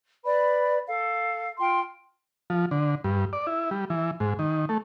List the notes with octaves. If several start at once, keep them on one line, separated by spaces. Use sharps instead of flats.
B4 D5 B5
A4 F5
F4 G5 C6
F3
D3
G2
D5
E4
G3
E3
G#2
D#3
A3